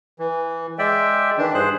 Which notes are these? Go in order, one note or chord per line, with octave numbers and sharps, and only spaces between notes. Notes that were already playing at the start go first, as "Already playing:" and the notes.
E3
G#3 D5 E5 G5
D#3 E3 D4
G2 G#4 C5 F#6